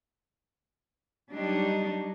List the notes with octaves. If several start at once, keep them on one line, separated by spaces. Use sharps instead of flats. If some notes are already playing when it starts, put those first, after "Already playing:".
F#3 G3 D4 D#4